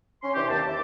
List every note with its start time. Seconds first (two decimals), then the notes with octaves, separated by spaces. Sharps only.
0.23 C#4 C6
0.34 C3 E3 D4 G4
0.48 D#2 A5
0.69 E5 D6